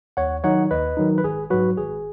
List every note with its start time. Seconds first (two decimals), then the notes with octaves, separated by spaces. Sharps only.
0.17 D#2 C#5 F#5
0.44 D#3 F#3 D#4 C#5 F#5
0.71 D#2 B4 D#5
0.97 D#3 F#3 D#4
1.18 B4
1.24 G#1 G#4
1.50 G#2 F#3 F#4 B4
1.77 G#1 G#4